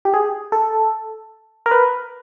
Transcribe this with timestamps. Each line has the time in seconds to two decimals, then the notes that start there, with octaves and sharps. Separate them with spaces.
0.05 G4
0.14 G#4
0.52 A4
1.66 A#4
1.71 B4